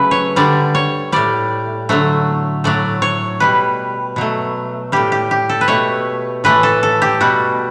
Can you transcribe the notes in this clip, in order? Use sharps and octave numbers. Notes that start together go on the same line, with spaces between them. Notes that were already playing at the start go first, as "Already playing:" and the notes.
Already playing: C#3 F#3 A3 B4
C#5
D3 G3 D5
C#5
A2 G3 D5
D3 F#3 A3
A2 F#3 A3 D5
C#5
B2 G3 B4
B2 F#3 A3
A2 G3 G4
G4
G4
A4
B4
B2 A3 C#5
A2 E3 A3 B4
A4
A4
G4
B2 G3 F#4